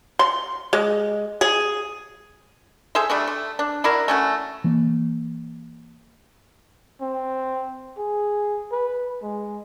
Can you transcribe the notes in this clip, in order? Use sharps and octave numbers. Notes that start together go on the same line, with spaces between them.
C6
G#3
G#4
G#4 A4 C5 E5
G3 A3 D4
A3
D4
D4 E4 F#4 A#4
A3 C#4 F#4
E3 A#3
C4
G#4
B4
G#3